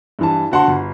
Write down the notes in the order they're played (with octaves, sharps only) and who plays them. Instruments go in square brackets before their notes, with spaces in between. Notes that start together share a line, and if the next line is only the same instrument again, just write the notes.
[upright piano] G2 E3 A5
D3 F#4 F#5 A5 C6
G1